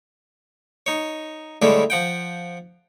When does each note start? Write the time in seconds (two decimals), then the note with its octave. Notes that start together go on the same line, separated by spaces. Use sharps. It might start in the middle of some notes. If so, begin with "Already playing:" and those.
0.86 D#4 C#5
1.62 A2 D3 G3 G#3 C#4 E4
1.90 F3 F#5 G5